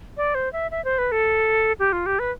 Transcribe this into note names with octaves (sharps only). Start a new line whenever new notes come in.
D5
C5
E5
E5
C5
B4
A4
G4
F4
G4
B4